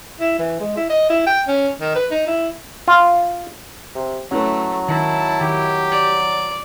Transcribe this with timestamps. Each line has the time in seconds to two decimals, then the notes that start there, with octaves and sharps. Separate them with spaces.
0.20 E4
0.39 E3
0.60 G#3
0.77 E4
0.90 D#5
1.10 E4
1.27 G5
1.48 C#4
1.80 D#3
1.95 B4
2.11 D#4
2.27 E4
2.88 F4
3.95 C3
4.32 F#3 A3 C#4 E4 B4
4.88 D#3 E4 A5
5.41 D#3 G4
5.92 D5